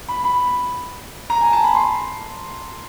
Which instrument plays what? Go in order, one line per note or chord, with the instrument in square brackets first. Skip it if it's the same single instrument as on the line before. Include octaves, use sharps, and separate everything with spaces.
[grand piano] B5
B5
A#5
G#5
A5
B5
C6